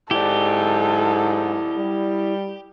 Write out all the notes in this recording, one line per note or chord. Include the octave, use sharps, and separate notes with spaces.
G#2 E4 G4 A4 D5
G3